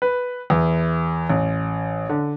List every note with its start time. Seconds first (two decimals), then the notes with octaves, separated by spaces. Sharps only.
0.02 B4
0.50 E2
1.30 A1
2.09 D3